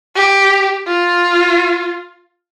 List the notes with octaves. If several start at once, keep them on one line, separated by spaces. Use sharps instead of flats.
G4
F4